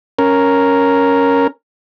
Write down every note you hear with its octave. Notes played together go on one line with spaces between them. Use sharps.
C#4 A#4